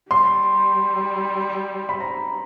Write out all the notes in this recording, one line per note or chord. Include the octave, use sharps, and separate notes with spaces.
G3 C6
B5
A#5